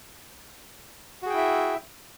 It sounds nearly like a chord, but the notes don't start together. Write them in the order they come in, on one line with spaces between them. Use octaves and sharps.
F#4 G#4 G5 E4 E5